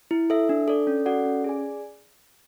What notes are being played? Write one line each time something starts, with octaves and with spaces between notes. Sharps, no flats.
E4
A4 E5
D4
A4 D5
C#4
F#4 A4 D5 F#5
C#4
G#4 D5 G#5